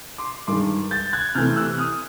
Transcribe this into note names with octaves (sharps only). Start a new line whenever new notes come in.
C6 D6
G2 D#3 G#3 C6 D6
G6 A6
F#6 G#6
C3 E3 A3 F6 G6
E6 F#6
D#6 F6